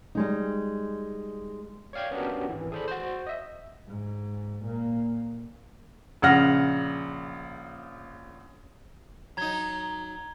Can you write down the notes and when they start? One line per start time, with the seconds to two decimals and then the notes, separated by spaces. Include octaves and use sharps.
0.15 G3 G#3 D#4
1.93 C#5 D5 F5 G5 G#6
2.11 B3 C#4 D4 F#4 G4 A#4
2.49 G#1 E3
2.72 G#4 A4 C5 D5 B5
2.88 F#4 C5
3.27 D#5 E5
3.88 G#2
4.65 A#2 A#3
6.22 A#1 C#3 F#5 F6 A#6
9.37 F#3 D#4 A#5 G#6 G7